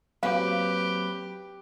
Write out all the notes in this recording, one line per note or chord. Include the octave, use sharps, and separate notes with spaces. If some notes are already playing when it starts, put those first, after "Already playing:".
F#3 A#3 C4 G4 B4 F5